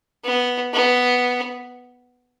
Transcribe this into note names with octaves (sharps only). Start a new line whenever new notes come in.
B3
B3